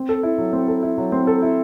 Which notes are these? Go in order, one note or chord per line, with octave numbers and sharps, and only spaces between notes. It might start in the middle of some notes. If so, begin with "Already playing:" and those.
Already playing: C4
A4
E4
F#3
C4
A4
E4
F#3
C4
A4
E4